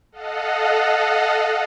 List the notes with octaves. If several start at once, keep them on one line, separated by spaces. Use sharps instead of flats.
A4 D#5 F5 F#5